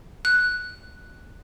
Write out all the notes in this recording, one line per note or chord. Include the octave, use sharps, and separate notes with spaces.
F#6